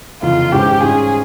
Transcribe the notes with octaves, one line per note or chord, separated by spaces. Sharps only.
F1 E2 C#3 E3 F4
G#1 G#2 E3 G#3 C#4 G4
G#2 G3 C#4 F4 G#4